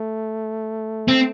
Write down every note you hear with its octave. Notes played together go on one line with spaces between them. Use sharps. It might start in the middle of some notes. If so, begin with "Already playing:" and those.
Already playing: A3
C4